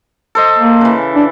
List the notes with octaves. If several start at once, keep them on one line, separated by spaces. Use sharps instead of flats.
A4 C5 D#5
A#3
C#3 E3
D4